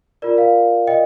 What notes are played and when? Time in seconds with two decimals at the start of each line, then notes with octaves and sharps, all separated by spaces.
0.22 F4 A#4 D5
0.38 F5
0.87 D#5 G5